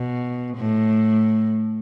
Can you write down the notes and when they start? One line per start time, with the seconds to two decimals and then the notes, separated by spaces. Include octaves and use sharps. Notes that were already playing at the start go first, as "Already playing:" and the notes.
Already playing: B2
0.57 A2